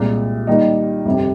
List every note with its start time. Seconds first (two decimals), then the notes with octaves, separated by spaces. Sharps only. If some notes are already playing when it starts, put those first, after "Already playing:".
Already playing: C2 A#2 G#3
0.47 D#3 G3 A#3 D#4
1.05 G1 F2 C3